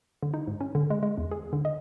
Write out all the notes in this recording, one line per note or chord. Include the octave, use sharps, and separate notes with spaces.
D3
D#4
G#2
C#4
D3
G#3
G#3
E2
G#4
D3
D#5